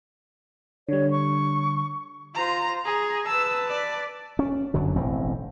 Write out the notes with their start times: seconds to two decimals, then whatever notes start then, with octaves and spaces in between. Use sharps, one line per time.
0.89 D3 G3 C#5
1.11 C#6
2.35 F4 C5 A#5
2.85 G#4 A#5
3.27 B4 A5 E6
3.68 D5
4.39 C#4
4.74 G1 F#2 D3 F#3
4.96 E1 A1 A2 C4